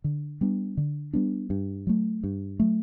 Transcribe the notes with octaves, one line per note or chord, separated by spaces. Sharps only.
D3
G3 B3 D4
D3
G3 B3 D4
G2
F#3 A3
G2
F#3 A3